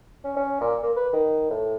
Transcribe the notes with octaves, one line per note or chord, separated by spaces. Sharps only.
C#4
C#4
A#2
A#3
B4
D#3
A2